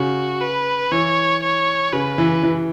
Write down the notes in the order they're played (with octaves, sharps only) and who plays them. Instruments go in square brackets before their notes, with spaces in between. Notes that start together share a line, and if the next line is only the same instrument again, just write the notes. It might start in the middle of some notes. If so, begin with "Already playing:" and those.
Already playing: [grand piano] C#3 [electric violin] F#4
[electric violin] B4
[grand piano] E3 [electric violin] C#5
[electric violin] C#5
[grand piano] C#3 [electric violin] B4
[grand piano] E3
E3